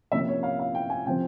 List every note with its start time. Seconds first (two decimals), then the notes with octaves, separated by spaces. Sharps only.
0.12 C3 F3 A#3 C#4 E5
0.28 C#5
0.43 F5
0.59 F5
0.75 G5
0.90 G#5
1.06 C3 F3 C4 G5